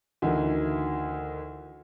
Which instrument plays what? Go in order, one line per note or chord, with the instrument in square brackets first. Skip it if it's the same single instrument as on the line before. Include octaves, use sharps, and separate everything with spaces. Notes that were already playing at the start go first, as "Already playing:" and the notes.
[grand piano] D2 D#3 E3